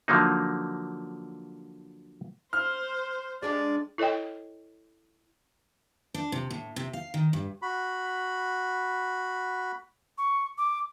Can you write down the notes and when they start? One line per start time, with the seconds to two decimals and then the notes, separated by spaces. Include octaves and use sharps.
0.08 D3 F3 F#3 A#3 D#4
2.53 C5 F6
3.42 G#3 D4 G4 D5
3.98 E4 A4 C#5 D#5 G5
6.14 D4
6.32 C3
6.50 A2
6.76 C3
6.93 F5
7.14 D#3
7.33 G2
7.62 F#4 B5
10.18 C#6
10.58 D6